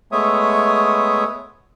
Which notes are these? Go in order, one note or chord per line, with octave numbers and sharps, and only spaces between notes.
G#3 A3 B3 C#5 E5 D#6